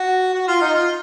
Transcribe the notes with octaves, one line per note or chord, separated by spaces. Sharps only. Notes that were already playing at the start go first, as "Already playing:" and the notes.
Already playing: F#4
F#4
F4
D#4
F4